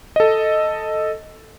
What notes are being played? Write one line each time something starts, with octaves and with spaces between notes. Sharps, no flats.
A4 D#5